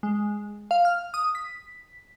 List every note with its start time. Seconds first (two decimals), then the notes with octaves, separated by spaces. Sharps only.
0.03 G#3
0.71 F5
0.85 F6
1.14 D#6
1.35 B6